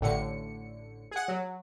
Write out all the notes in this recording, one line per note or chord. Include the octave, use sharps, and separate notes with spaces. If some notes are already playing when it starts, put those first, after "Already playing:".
A1 A2 D3 C#7
G#4 F#5
F#3